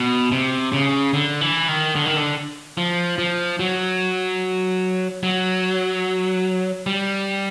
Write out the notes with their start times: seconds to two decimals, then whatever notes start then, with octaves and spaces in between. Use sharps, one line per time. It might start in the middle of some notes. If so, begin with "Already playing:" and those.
Already playing: B2
0.32 C3
0.73 C#3
1.14 D3
1.41 E3
1.68 D#3
1.96 D3
2.06 D#3
2.16 D3
2.77 F3
3.18 F3
3.59 F#3
5.23 F#3
6.86 G3